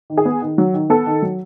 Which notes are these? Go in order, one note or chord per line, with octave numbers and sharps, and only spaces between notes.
D#3
G#4
B3
D#3
F#3
D#3
B3 A4
D#3
F#3